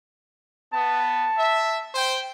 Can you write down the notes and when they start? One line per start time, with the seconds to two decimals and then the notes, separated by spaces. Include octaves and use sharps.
0.73 B3 A5
1.37 E5
1.94 C5 G5